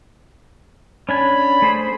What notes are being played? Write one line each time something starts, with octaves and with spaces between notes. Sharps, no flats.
C#4 D4 G#5 B5
A3 G#4 C5